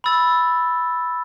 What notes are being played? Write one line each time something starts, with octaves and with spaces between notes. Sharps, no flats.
B5 E6 A6